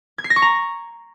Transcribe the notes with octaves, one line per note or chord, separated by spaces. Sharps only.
G#6
C7
A#6
C#6
A#5